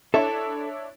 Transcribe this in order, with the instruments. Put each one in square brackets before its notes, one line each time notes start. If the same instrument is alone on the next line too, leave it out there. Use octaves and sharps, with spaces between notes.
[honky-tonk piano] D4 E4 C#5 [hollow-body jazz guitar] A4 E5